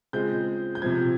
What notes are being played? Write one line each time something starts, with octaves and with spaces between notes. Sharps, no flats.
C#3 G#3 C4 F4 G6
G6
C3 F3 C4 G#6